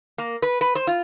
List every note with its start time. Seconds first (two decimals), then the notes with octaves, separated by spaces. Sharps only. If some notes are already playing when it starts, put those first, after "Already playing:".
0.18 A#3
0.42 B4
0.61 B4
0.75 C5
0.87 F4